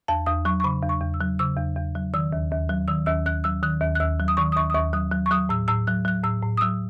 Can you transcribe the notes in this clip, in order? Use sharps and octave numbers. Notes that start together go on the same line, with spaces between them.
E2 A5
E2 D#6
F#3 C#6
C#6
C#3 B5
E2
C#6
E2
E6
F#3
C#3 E6
E2
E2
F#3
D#3 E6
D#2
D#2
F#3
D#3 E6
D#2 E6
D#2 F#6
F#3 E6
D#3 F#6
D#2
F#6
D#2 E6
F#3
D#6
D#3 C#6
D#6
D#2 C#6
D#6
D#2 C#6
F#3 D#6
F#3
C#6
F#3 D#6
A2 E6
A2 E6
F#3 F#6
F#3 F#6
A2 E6
A2
D#6
F#3 E6